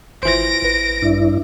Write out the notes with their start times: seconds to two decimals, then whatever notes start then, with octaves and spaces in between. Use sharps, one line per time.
0.23 G#1 E3 F4 C5 A#6 D7
0.62 A1 B4
1.02 G2 D4 E4